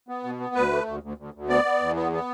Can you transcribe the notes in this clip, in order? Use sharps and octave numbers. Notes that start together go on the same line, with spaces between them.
B3
B2
B3
D2 B4
A3
D2
D2
D2
D2
B3 D5
B3
E2
B3
B3